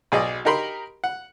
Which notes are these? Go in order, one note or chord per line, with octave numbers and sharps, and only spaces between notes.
B1 G#4 D5 D#5
D#4 G4 A#4 B5 C6
F#5